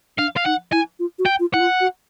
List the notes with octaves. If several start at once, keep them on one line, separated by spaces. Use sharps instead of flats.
D4 F5
F5
D#4 F#5
E4 G#5
F4
F#4
G5
F4
E4 F#5
F4
F#4